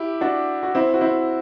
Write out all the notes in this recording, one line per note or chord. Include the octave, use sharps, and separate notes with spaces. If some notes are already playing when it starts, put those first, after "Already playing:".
Already playing: E4 G4
D4 F#4
F#4
C4 E4
F#4
C4 E4